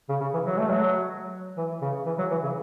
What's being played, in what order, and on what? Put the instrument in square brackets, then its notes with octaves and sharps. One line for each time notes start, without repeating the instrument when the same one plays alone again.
[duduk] C#3
C#3
E3
F#3
A3
F#3
E3
C#3
E3
F#3
E3
C#3